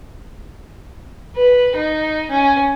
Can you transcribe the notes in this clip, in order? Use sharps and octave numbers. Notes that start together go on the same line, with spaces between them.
B4
D#4
C#4